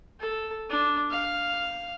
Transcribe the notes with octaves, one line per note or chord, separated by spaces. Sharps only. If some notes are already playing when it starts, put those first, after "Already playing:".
A4
D4
F5